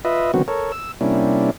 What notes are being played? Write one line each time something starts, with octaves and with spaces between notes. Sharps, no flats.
F4 B4 D#5 E5
D3 D#3 F#3 B3 C4 F#4
A4 A#4 C#5
E6
C3 G3 A#3 C#4 D4 E4